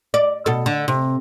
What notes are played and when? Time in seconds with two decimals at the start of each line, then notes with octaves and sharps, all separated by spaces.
0.14 D5
0.46 B2 A4
0.66 D3
0.88 C3